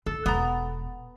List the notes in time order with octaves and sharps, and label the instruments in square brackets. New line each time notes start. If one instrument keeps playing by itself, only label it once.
[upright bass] D3 [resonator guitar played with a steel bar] A4
[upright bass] E1 [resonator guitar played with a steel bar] B3 A#5